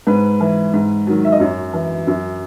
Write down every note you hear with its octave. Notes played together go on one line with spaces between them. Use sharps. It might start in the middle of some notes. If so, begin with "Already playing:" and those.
G#2 B4
E3
G#2
D#3 F#3
E5
D#5
F#2 C#5
E3
F#2